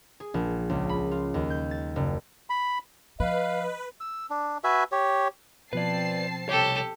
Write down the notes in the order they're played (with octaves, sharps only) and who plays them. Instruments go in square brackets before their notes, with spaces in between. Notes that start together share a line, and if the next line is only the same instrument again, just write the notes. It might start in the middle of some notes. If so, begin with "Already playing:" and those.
[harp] G#4
A#1
C#2
B5
F4
D#2
G6
A6
F#1
[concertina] B5
[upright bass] F3 [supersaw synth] B4 [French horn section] D#5 [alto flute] F5
[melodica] E6
D4
F#4 B4 E5 G#5
G4 C#5
[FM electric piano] B2 F3 [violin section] C4 A5 C7 [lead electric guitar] B4 D5
[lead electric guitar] C2 C#5 [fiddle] G4 A4